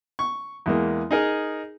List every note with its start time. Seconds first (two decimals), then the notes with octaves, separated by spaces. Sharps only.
0.19 C#6
0.66 E2 G#3 A#3
1.11 D#4 G#4 A#4